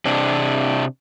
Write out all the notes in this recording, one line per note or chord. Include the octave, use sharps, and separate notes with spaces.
C3 C4 D4